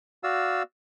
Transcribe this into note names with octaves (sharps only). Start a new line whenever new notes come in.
F#4 D5 F5 E6